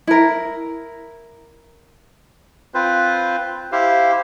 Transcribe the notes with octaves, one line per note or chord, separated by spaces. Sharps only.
E4 A#4
C4 F4 B4 C5
E4 G4 C5 F5